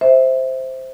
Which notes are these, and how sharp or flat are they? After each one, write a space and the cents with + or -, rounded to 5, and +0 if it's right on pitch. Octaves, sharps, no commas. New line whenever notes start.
C5 +0 E5 -15